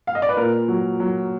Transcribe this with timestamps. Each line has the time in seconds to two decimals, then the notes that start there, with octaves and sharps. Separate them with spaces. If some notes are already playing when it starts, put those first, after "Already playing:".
0.07 F5
0.15 D#5
0.22 D5
0.29 B4
0.37 A#2 A#4
0.68 F#3
1.00 F#3